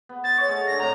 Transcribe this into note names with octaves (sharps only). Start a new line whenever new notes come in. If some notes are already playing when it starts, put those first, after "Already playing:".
B3
C5 A6
C#5 D#5 F#5
A3 G#4
D3 G#3 F5 A#6
A2 C3 A#5